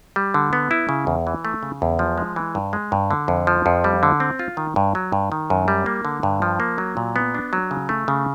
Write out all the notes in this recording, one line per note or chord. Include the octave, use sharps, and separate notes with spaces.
G3
D3
B3
E4
C#3
E2
E3
A3
C#3
E2
F3
G#3
E3
G2
G#3
G2
D3
F2
F3
F2
G3
D3
C4
F4
D#3
G2
F#3
G2
D#3
F#2
G3
A#3
D3
G2
F3
A#3
F#3
A#2
B3
D4
F#3
C#3
A3
C#3